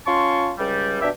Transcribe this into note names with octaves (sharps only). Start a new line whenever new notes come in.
C#4 F4 A5 C6 C#6
C#2 G3
B2 D4 G4 E5